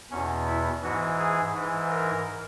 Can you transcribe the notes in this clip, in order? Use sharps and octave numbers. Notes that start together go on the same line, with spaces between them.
E2 B2 C#4
E4
G#2 E3 F#4
G#4
G#2 E3
A#4